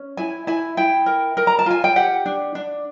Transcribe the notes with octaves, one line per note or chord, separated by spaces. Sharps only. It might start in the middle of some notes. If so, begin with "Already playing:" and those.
Already playing: C#4
E4 G#5
E4 G#5
E4 G5
A#4
A#4
A#5
A5
F4 G#5
G5
G4 F#5
D4
D4